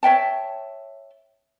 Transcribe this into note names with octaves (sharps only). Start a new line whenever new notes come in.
C#5 E5 G5 A5